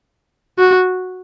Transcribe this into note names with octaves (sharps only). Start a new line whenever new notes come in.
F#4